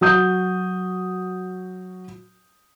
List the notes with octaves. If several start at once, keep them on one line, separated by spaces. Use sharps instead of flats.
F#3 F#4 D#6 G6